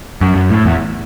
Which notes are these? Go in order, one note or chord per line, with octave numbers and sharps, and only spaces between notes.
F#2
F#2
A2
E2